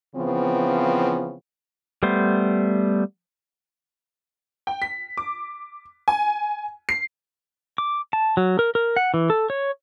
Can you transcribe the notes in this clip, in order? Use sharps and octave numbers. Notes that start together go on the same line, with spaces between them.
C#3 E3 F3 B3 C4
G3 A3 B3 C5
G5
B6
D6
G#5
C7
D6
A5
F#3
A#4
A#4
F#5
E3
A4
C#5